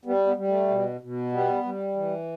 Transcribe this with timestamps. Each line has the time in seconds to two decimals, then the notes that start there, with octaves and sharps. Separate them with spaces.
0.05 G3 B3
0.27 B3
0.36 G3
0.48 A3
0.68 B2
1.01 B2
1.32 G3 B3
1.64 G3
1.96 E3